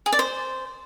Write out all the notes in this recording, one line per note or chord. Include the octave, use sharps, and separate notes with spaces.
G#4
D5
C5